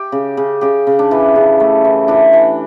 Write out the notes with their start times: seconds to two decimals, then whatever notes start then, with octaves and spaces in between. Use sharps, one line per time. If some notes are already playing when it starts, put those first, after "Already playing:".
Already playing: G4
0.12 C#3
0.37 C#3
0.61 C#3 G4
0.87 C#3
0.99 D4
1.11 E3
1.36 C#3
1.60 A3
1.85 E3
2.08 E3 D4
2.33 E3